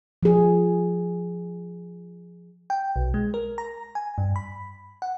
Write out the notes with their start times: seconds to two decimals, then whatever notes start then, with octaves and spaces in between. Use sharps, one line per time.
0.23 F3 G#4
2.70 G5
2.96 B1
3.14 G#3
3.34 A#4
3.58 A#5
3.95 G#5
4.18 G2
4.36 B5
5.02 F#5